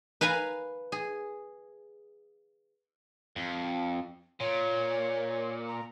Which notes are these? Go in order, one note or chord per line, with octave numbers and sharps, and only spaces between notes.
B4 F5 G#5 A#5
G#4
F2
A#2 C#5
A#5